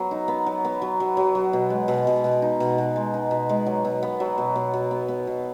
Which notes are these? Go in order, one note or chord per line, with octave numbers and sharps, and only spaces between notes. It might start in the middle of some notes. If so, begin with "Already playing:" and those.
Already playing: F#3 B3
D#4
B3
F#3
B3
F#3
F#3
F#3
F#3
B2
G#3
B2
B2
B2
D#4
B2
B2
G#3
D#4
B2
G#3
F#3
B2
B3
F#3
B2
B2
B2
B3
B3
B2